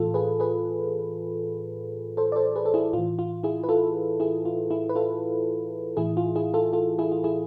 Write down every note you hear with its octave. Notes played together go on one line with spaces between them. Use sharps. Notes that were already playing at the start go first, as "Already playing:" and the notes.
Already playing: A2 E3 F4 A4
G#4 B4
G#4 B4
A4 C5
D5
A4 C5
G#4 B4
A4
E4 G#4
A2 E3 F4
F4
E4 G#4
B4
F4 A4
E4 G#4
F4
E4 G#4
B4
F4 A4
A2 E3 E4 G#4
F4
E4 G#4
F4 A4
F4 A4
E4 G#4
F4
E4 G#4